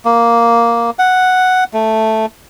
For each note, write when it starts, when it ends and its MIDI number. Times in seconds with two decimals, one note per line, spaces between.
0.05 0.90 58
0.99 1.64 78
1.73 2.26 57